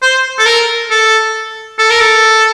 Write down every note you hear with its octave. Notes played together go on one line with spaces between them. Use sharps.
C5
A4
A#4
A4
A4
A#4
A4